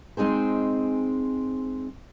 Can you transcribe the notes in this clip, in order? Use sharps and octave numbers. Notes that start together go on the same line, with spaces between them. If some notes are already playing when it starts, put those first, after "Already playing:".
G#3 C4 D#4 G#4 C5